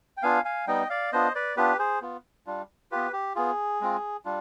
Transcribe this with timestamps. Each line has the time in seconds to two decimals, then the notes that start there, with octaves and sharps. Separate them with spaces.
0.17 G5
0.22 B3 D4 F4 F5 G#5
0.45 F5 G#5
0.67 G3 B3 D#4 D#5 G5
0.90 D5 F5
1.12 B3 D4 F4 C5 D#5
1.35 B4 D5
1.57 B3 D4 F4 G4 B4
1.79 G#4 C5
2.02 B3 F4
2.46 G3 D4 F4
2.92 B3 F4 G4 B4
3.13 G4
3.35 B3 F4 G#4
3.81 G#3 C4 F4
4.25 G3 D4 F4